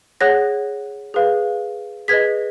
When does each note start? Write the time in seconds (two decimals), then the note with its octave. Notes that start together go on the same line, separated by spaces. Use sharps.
0.21 G#4 C#5 F#5 F#6 A#6
1.14 G#4 B4 F5
2.08 G#4 B4 D#5 G#6 B6